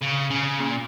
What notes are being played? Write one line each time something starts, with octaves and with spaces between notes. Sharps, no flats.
C#3
C#3
A#2